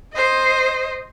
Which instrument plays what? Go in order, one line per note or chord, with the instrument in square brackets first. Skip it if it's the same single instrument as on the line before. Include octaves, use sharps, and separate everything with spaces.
[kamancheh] C5 D#5